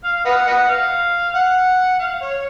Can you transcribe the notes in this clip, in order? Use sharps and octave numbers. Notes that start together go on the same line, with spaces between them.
F5
B4 D#5 F#5
B4 D#5 F#5
F5
F#5
F5
C#5